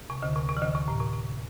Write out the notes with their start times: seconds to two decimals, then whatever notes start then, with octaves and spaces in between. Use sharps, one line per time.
0.10 C3
0.22 D2 D3
0.36 C3
0.49 C3
0.57 E3
0.62 D2 D3
0.75 C3
0.88 A2
1.00 C3
1.13 C3